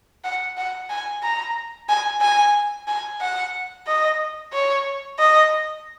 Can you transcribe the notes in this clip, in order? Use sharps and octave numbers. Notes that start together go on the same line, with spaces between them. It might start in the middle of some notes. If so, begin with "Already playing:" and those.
F#5
F#5
G#5
A#5
G#5
G#5
G#5
F#5
D#5
C#5
D#5